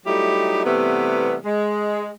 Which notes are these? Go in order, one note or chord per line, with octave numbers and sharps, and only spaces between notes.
F#3 G3 A3 D#4 E4 G4
C3 E3 G3 A3 B3
G#3